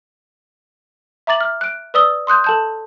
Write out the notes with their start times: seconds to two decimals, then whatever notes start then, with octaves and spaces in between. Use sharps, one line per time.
1.27 E5 A#5 D6 A6 F#7
1.40 F6
1.61 F#6 D7
1.94 B4 D5 D#6 E6 G7
2.27 C6 D#6 F#6 G6
2.44 A4 A5 G6